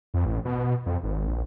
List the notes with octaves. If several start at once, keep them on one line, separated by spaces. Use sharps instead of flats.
F2
A1
B2
F2
G#1
A#1